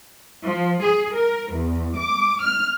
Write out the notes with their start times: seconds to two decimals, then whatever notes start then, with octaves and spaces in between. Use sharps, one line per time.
0.45 F3
0.83 G#4
1.15 A#4
1.53 E2
1.96 D6
2.41 F6